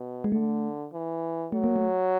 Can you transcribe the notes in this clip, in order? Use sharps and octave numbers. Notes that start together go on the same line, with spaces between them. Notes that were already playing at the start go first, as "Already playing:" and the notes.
Already playing: B2
G#3
D3 A3
E3
F#3 A3
A#3
A3